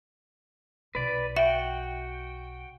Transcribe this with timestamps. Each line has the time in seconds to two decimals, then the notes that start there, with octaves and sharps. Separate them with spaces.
0.95 B1 B4 D5
1.36 F#4 E5 G5